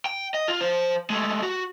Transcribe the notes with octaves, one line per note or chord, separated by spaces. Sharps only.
G5
D#5
F4
F3 C5
G#3 A3
F#4